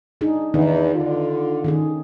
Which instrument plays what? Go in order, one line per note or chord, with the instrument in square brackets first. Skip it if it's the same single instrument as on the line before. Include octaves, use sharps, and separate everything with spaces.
[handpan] D4 D#4 G#4
[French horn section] E2 [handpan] D#3 D4 D#4
[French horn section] D3 F4
[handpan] D#3 C#4 G#4